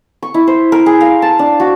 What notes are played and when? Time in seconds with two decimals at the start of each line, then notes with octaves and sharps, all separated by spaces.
0.22 C#6
0.34 E4
0.47 C5
0.72 A#4
0.86 G#4
1.01 F5
1.22 A5
1.39 D4
1.60 F#4